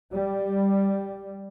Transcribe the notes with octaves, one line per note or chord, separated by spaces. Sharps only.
G3